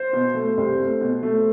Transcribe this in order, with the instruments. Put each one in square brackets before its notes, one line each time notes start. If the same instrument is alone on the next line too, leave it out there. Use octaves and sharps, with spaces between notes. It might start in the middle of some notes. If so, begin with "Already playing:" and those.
Already playing: [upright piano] C5
[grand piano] B2
A3
C2
A3
B2
A3